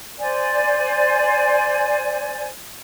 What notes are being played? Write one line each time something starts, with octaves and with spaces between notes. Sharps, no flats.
C5 D5 G#5